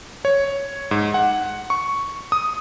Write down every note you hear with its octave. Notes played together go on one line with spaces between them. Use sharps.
C#5
G#2
F#5
C#6
D#6